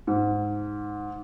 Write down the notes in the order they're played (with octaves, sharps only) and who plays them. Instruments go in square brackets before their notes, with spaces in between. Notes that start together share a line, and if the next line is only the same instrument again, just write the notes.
[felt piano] G#2